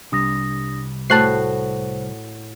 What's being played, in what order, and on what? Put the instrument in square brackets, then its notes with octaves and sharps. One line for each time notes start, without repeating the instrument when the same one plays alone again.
[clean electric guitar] C2 G3 [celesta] D4 D#6 A#6
[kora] A2 F#4 [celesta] C5 [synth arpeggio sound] A5 F#6 C7